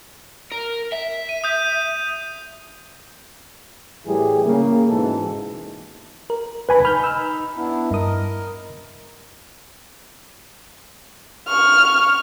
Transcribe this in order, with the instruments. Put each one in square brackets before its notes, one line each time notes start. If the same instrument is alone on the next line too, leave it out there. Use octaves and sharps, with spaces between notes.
[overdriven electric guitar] A#4
E5
[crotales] D#7
D#6 G6 D#7
[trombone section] A2 E3 G3 G4 G#4
C#3 A#3
G#2 B2 E3 A4
[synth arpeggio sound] A#4
[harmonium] D4 [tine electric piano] B4 G#5 B5
[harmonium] D#4 [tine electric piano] B5 [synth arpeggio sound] F6 G6
[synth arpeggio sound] E6 F6
[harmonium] B3 D4 E4
[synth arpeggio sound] G2 D#6 [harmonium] A#4 D#5
[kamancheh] C#6 F6